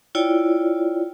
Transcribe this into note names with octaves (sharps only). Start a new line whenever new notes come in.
E4 F4 C#5 D5 G5